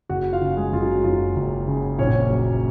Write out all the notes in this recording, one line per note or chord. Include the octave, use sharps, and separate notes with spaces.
F#1 F#4 F#5
F4 F5
C#3
G#3 G#4
F#1 F4
F#3 F#4
F#2 F4
F#1
C#3
A#1 C#4 C#5
F#3